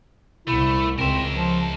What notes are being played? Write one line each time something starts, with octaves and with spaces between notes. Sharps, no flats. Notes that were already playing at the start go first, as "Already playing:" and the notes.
C2 A3 E4
C#2 C4 A#4 E5
F3